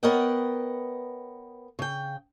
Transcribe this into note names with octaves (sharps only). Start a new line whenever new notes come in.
B3 A#4 C#5 D#5 F#5 G5
C#3 G5